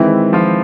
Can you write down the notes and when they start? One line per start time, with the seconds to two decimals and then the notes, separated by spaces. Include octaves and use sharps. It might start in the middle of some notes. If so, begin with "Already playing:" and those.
Already playing: D#3 E3 G#3 C4 E4
0.33 F3 F4